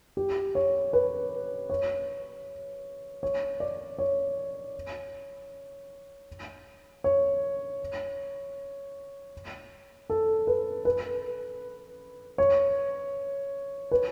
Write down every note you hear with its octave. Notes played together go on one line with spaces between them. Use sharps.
G4
C#5
B4
C#5
C#5
D5
C#5
C#5
A4
B4
B4
C#5
B4